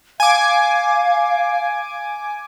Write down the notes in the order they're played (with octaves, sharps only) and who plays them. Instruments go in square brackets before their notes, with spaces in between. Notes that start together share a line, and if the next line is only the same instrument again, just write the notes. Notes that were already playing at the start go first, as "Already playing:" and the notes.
[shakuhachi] F5 [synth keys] G#5 D6